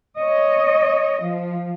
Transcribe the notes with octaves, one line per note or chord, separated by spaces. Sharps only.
C#5 D#5
F3